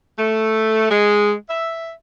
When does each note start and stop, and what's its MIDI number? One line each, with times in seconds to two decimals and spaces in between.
0.18 0.90 57
0.90 1.32 56
1.49 1.91 76